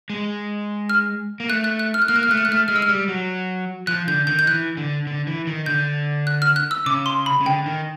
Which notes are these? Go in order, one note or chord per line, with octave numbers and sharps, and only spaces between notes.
G#3
F6
A#3
A3 F#6
F#6
F#6
F6
F#6
A#3 F6
F#6
F6
A3 F#6
F6
F#6
A3 F6
G#3 F6
E6
F6
G3
F#3
F3 F#6
D3 G6
D#3 G6
G6
E3 F#6
D3
D3
E3
D#3
D3 G6
F#6
F6
F#6
E6
C#3 D6
C6
B5
C#3
D3 G5
D#3